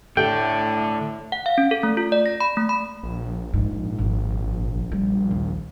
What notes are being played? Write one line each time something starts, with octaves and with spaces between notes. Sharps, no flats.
A2 D3 A3 D4 G5
F#5
F5
C#4
A4
A3
F4
D5
A#6
B5
A3
B5
A#1
G#2
G#1
G3
D#2